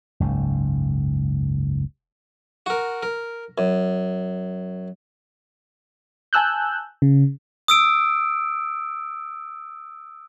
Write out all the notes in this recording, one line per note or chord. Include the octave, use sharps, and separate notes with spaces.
F#1 C#2 G#2
F#4 A#4
A#4
F#2
G#5 A5 E6 F#6 G6
C#3
D#6 E6 D7